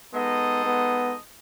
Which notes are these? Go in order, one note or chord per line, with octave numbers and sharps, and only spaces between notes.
G#3 B3 D#4 A4 D#5
B3